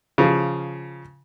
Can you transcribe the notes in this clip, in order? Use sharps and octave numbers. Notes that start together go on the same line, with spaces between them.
C#3 F3